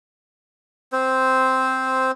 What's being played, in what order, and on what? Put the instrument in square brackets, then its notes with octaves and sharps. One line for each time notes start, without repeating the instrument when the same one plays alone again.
[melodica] C4 C5